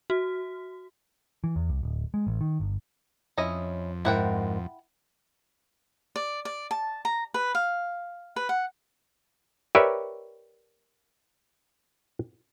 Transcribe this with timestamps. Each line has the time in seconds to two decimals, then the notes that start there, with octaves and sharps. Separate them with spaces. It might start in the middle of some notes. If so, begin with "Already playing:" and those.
0.10 F#4
1.44 E3
1.56 E2
1.69 C2
1.83 D1
2.14 G#3
2.27 A1
2.41 D#3
2.60 G1
3.38 F2 C#4 E4 D#5
4.05 G#2 E4 A#4 F#5 G5
6.16 D5
6.45 D5
6.71 A5
7.05 A#5
7.34 B4
7.55 F5
8.36 B4
8.49 F#5
9.75 G4 A#4 B4 C#5 D5 E5